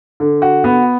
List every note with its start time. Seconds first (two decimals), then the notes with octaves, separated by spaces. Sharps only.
0.20 D3
0.42 F#4
0.64 B3